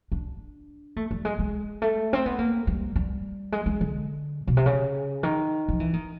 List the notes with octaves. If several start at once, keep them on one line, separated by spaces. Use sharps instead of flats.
D4
A3
G3
G#3
G#3
A3
C4
B3
A#3
G3
G3
G#3
G#3
D3
B2
C3
C#3
D#3
F3
E3
D#3